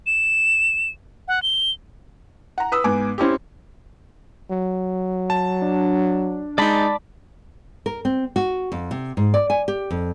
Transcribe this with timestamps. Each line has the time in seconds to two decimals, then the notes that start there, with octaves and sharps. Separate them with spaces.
0.06 E7
1.28 F#5
1.43 G7
2.58 F#5 A#5
2.72 B4 D#6 E6
2.84 G#2 B3 G#5 D6
3.18 C4 C#4 E4 G4
4.51 F#3
5.30 A5
5.62 D4
6.58 G#3 D#4 D5 A5 B5
7.86 A#4
8.05 C4
8.36 F#4
8.72 F2
8.91 C3
9.17 G#2
9.34 D5
9.50 G#5
9.68 G4
9.90 F2